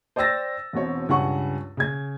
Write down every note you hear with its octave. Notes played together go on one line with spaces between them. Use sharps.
C5 D5 G5 E6 A6 A#6
E1 B2 C4 C#5
C#2 G2 C#4 F#5 C#6
C#3 G#6